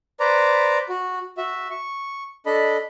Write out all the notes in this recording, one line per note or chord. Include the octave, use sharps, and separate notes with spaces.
B4 C5 D5 A#5
F#4
F#4 E5
C#6
D4 A4 D#5 B5